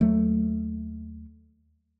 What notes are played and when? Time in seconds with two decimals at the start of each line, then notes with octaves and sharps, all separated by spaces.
0.01 D#2 F#3 A3